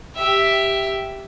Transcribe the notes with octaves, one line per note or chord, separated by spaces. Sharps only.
G4 E5